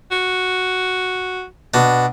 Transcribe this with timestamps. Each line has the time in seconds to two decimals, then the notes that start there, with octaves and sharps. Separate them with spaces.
0.12 F#4
1.74 B2 D4